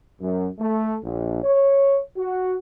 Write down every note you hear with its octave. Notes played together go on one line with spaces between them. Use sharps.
F#2
A3
A#1
C#5
F#4